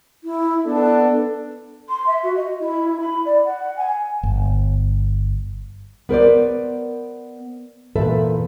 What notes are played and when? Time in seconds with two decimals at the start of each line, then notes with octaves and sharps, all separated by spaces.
0.24 E4
0.65 B3 D4 A4
1.88 C6
2.06 E5
2.23 F#4
2.36 D#5
2.59 E4
3.00 B5
3.25 D5
3.44 F#5
3.76 G#5
4.23 G1
6.09 B3 A#4 C5 D5
7.95 E2 A#2 A4 B4 E5